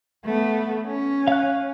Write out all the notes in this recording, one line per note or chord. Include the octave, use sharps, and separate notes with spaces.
A3 B3
C#4
F5 F#6